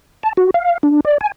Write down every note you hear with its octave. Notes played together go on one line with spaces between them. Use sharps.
A5
F#4
F5
D4
D5
G#5